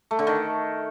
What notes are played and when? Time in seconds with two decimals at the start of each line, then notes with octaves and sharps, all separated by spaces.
0.11 A3
0.19 D3
0.27 D#3